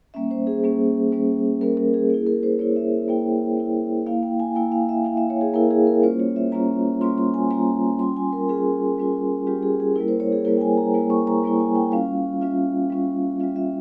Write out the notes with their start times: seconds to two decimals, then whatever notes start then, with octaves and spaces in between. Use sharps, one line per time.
0.14 G3 A#3 C#4 E5
0.31 C5
0.47 G#4
0.63 G3 A#3 C#4
1.12 G3 A#3 C#4
1.61 G3 A#3 C#4 A#4
1.77 A#4
1.94 G#4
2.10 A#3 G#4
2.14 E4
2.27 A#4
2.43 C5
2.59 A#3 E4 C#5
2.76 E5
3.08 A#3 E4 G5
3.57 A#3 E4
4.06 A#3 E4 F5
4.23 G5
4.40 G#5
4.55 A#3 E4 G5
4.72 F5
4.89 E5
5.04 A#3 E4 F5
5.17 E5
5.30 C#5
5.41 G#4
5.54 A#3 E4 A#4
5.71 G#4
5.87 A#4
6.03 G3 A#3 C#4 F4 C5
6.19 C#5
6.36 E5
6.52 G3 A#3 C#4 F4 A#5
7.01 G3 A#3 C#4 F4 C6
7.18 C6
7.34 G#5
7.51 G3 A#3 C#4 F4 A#5
7.99 G3 C#4 F4 C6
8.16 G#5
8.33 A#4
8.49 G3 C#4 F4 G#4
8.98 G3 C#4 F4
9.47 G3 C#4 F4 G4
9.63 G#4
9.80 G#4
9.96 G3 A#3 E4 A#4
10.08 C5
10.20 C#5
10.32 G#4
10.45 G3 A#3 E4 A#4
10.57 G5
10.61 G#5
10.77 A#5
10.94 G3 A#3 E4
11.10 C#6
11.27 A#5
11.43 G3 A#3 E4
11.60 G#5
11.75 G5
11.92 G3 C#4 F4 F5
12.41 G3 C#4 F4 E5
12.90 G3 C#4 F4
13.39 G3 C#4 F4 E5
13.56 E5